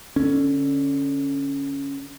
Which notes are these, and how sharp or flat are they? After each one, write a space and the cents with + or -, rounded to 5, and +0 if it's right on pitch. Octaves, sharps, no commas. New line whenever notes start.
D3 +0 C#4 +0